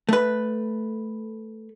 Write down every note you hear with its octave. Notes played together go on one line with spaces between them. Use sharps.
A3 B4